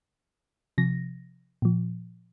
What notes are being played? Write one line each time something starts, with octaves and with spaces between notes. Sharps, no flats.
C3 F3 A#6
A#2 F3